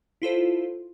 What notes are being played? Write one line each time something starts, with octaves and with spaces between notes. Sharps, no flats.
E4 F4 A4 C5